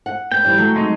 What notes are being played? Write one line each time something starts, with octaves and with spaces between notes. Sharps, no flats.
F#5
B3 G5
E3 G3 D5
F#3 A3
G#3 C4 D#4